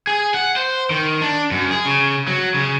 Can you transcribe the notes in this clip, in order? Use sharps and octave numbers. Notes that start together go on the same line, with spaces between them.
G#4
F#5
C5
D#3
D4
F#2
G#4
C#3
F#3
C#3